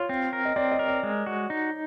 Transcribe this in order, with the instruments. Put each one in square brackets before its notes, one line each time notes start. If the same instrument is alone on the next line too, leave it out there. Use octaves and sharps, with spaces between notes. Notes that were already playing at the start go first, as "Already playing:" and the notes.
Already playing: [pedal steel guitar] F4 [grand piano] C#5
[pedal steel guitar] C4
A#4
[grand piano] D#5
[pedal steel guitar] C4 [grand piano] D5
[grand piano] D#5
[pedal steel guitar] A#4
[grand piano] D5
[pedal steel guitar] G#3
F#4
D#4